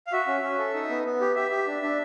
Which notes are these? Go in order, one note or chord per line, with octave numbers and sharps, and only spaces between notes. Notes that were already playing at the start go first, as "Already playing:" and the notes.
F5
F#4 E5
C#4
C#4
A4
D#4
B3
B3
G4
G4 E5
G4
D4
D4